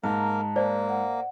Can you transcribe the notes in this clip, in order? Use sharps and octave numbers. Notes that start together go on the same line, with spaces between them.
G#2 A#3 A#4 A5 A#5
A#3 C5 D5
F#5